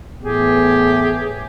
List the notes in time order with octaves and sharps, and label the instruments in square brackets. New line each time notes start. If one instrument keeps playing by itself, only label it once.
[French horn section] E2 A2 B3 [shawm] G4 [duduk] G#4